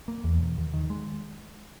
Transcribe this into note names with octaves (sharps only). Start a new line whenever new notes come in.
A#3
E2
E1
D#2
D#3
G#3